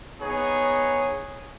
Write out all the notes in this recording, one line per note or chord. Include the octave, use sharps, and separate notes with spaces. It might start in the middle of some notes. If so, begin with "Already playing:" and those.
B3 D#4 G#4 C#5